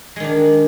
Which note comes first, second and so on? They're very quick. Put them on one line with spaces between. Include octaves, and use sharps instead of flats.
G#3 D#3 D4